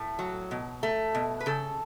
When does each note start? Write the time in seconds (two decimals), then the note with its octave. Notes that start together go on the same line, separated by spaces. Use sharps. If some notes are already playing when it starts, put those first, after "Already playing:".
Already playing: A2 A3
0.19 F#3
0.51 B2
0.83 A3
1.15 B2
1.40 B4
1.46 C#3 A4